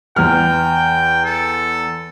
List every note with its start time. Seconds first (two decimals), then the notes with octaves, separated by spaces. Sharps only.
0.16 E2 G5 F6
1.25 A4